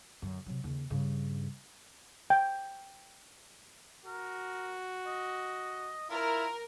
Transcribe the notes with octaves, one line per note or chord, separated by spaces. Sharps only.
F#2 D3
C3 F#3
D#2 C#3
G2 C#3
G5
F#4 A#4
D#5
E4 F4 A#4